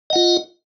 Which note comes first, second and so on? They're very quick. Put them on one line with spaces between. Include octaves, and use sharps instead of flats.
D#5 F#5 F4